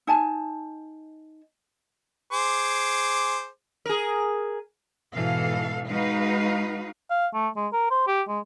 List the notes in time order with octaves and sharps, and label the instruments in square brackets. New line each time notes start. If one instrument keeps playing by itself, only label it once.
[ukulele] D#4 G#5 A5
[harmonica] G#4 C5 D6
[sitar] G#4 A#4
[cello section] G#2 B2 E3 A4 F5
G#3 D#4 F#4 B4 F5
[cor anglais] F5
A3
G#3
A#4
C5
G4
G#3